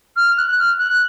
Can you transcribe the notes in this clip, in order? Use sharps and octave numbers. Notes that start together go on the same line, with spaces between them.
F6
F#6
F6
F#6